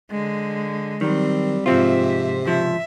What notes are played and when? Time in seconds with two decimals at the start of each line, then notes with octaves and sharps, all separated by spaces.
0.11 D3 G#3
1.01 D#3 F#3 G3 C4
1.66 G#2 C3 F3 C4 F4 E5
2.45 C#2 F3 E5